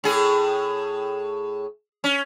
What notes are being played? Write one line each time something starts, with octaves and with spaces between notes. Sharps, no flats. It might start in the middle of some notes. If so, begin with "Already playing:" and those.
A2 G#4
C#4